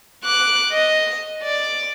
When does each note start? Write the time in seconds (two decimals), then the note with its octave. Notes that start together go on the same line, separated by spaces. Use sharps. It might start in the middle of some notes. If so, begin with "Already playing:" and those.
0.24 D6 F#6
0.72 D#5
1.43 D5